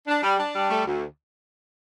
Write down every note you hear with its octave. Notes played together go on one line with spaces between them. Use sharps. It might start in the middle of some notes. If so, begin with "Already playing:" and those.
D4
G3
D4
G3
A3
D2